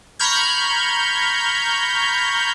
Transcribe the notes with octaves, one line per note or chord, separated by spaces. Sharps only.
A#5 B5 C#6 F6 G6 G#6